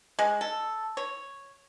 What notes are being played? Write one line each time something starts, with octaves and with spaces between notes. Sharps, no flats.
G#3
A4
C#5